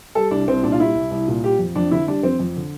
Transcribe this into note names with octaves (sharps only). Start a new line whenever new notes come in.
G3 A4
C2 D4
C2 C4
A#2 D4
F4
G3 E4
C2
C2
A#2
G3 G4
F2
F2 D4
D3 E4
G3 D4
F2 C4
F2
D3